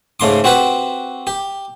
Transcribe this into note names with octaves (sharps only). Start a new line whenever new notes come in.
G#2 C#3 A3 C6 D6
C4 F#4 G4 B4 G5
G4